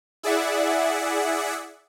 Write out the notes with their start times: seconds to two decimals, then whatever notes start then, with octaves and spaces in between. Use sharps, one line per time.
0.23 E4 G#4 D5 E5 F#5